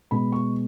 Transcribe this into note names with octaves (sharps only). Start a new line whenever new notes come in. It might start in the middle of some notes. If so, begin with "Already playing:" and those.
B2 G#3 B3 B5
C#6